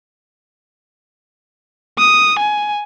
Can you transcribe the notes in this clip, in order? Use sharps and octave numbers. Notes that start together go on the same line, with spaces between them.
D#6
G#5